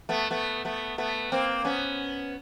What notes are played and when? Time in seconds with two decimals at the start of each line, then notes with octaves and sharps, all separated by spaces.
0.09 A3 B3
0.30 A3 B3
0.65 A3 B3
0.98 A3 B3
1.32 A#3 C4
1.64 B3 C#4